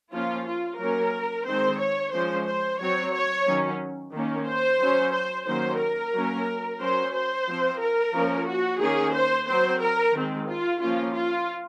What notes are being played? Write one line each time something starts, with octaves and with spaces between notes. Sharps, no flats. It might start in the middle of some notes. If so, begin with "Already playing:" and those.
F3 A#3 C#4 F4
F4
F#3 A#3 C#4 A#4
D#3 G#3 C4 C5
C#5
F3 G#3 C#4 C5
C5
F#3 C4 C#5
C#5
D#3 F#3 C#4
D#3 A#3 C#4
C5
F#3 C#4
C5
D#3 F#3 A#3 C#4 C5
A#4
F#3 A#3 C#4
F#3 C#4 C5
C5
F3 C4
A#4
F3 A#3 C#4
F#4
D#3 A#3 C#4 G#4
C5
F#3 C4 C5
A#4
D#3 G#3 C4
F4
F3 A#3 C#4 F4
F4